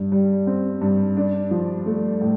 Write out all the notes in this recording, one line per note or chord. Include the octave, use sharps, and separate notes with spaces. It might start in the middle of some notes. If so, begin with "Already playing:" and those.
Already playing: G2
G3
C4
G2
D4
F3
A3
A2